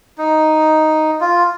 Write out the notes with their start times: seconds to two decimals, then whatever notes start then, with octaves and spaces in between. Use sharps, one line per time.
0.18 D#4
1.21 F4